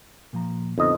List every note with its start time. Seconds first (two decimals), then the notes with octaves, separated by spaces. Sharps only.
0.33 A#2 F3 A#5
0.78 F2 D3 B3 D#4 D#5